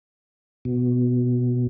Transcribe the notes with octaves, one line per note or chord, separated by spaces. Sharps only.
B2